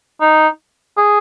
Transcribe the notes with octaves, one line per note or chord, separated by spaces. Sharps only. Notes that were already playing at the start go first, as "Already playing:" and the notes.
D#4
G#4